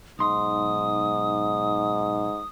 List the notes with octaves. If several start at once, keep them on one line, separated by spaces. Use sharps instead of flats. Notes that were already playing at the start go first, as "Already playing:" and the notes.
B1 G#2 C6 D#6